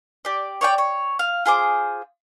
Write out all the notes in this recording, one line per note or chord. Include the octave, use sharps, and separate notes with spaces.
G4 D5
C#5 D5 F#5 G5
C#5
F5
F4 G#4 C5 D6